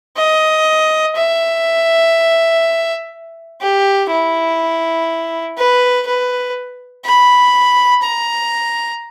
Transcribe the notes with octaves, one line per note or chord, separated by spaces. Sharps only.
D#5
E5
G4
E4
B4
B4
B5
A#5